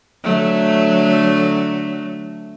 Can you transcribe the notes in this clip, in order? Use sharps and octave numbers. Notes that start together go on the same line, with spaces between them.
D3 F#3 A3